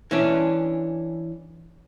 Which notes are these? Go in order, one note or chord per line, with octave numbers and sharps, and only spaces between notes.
E3 C#4 D4